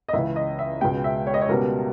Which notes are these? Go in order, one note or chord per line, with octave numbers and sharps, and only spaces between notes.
D#5
C#2 C#3 E3 E5
D#5
E5
C#2 B2 G#3 G5
E5
C#5
D#5
C#5
C#2 B2 G3 B3 A#4